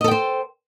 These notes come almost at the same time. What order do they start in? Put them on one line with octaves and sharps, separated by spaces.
D#5 A4 G5 C5